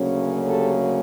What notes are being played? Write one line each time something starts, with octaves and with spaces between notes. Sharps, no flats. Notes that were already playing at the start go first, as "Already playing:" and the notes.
Already playing: D2 C#3 F#3 A#3 C#4
G4 A4